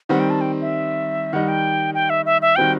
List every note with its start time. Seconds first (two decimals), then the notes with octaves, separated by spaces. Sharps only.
0.09 D#3 G3 C4 F#5
0.19 G5
0.30 A5
0.41 G5
0.61 E5
1.33 D#3 G3 D#4 F#5
1.48 G5
1.94 G5
2.10 E5
2.26 E5
2.42 E5
2.56 D#3 G3 C4 F#4 G5